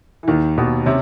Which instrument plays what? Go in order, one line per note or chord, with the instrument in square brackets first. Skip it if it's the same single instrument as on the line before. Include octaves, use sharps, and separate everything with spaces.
[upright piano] E3
[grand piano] D#2 [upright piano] D#3
[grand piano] D#2 [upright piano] B2
[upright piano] C3 [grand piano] C#4